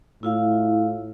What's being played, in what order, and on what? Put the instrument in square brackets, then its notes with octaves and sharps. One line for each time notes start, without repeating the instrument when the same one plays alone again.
[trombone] A2 [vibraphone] E4 F4 F5